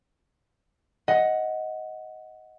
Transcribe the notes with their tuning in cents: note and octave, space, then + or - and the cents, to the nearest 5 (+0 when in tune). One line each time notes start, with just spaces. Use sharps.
D#5 +15 F#5 +0